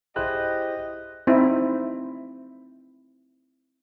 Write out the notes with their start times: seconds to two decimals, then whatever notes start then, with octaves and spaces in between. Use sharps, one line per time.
0.16 E4 G4 G#4 C5 D#5 F#6
1.27 C4 D#4 E4